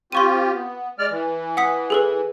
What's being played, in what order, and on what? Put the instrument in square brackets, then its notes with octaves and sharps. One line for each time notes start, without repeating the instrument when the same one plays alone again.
[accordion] C4 F4 G4 [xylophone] C6 C#6 D#7
[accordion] B3
G#3 D5 F6
E3
[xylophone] F#5 D#6 B6
G#4 A4 B4